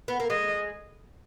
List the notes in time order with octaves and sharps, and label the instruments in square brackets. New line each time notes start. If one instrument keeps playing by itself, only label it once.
[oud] B3
A#3
[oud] G#3 [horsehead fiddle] D#5